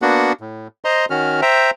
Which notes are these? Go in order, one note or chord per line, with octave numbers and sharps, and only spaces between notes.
A#3 B3 D4 F#4 F#5
A2
C5 D#5 A#5 C6
D#3 C#4 F#4 F6
C5 E5 G5 A#5